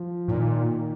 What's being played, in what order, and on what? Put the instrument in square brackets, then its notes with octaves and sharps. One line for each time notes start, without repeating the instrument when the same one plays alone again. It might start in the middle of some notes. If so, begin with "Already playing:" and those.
Already playing: [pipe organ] F3
[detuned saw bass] A2
[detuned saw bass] A#2 [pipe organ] D#3